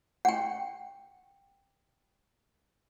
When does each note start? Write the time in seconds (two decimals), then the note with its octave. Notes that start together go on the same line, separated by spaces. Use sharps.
0.25 F#5 G5